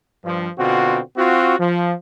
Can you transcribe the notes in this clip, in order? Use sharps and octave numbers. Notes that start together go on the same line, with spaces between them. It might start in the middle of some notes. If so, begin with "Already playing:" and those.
G2 F3
B2 D3 C4 F4 F#4
C4 F4 F#4
F3